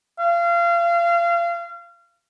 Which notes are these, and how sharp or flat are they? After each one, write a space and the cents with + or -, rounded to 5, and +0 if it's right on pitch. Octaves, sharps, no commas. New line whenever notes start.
F5 -30